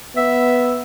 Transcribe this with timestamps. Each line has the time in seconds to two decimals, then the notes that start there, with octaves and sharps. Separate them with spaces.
0.17 B3 E5